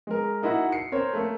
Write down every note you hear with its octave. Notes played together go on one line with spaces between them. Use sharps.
G#3 A#4
A#3 D#4 E4 F#4 F#5
C7 C#7
C4 A#4 C5 C#5
A3 A#3